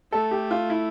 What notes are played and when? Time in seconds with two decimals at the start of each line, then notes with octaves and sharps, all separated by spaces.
0.12 A3 A4
0.31 G4
0.51 F4
0.70 E4